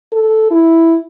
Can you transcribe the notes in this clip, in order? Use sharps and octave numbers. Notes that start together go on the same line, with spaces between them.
A4
E4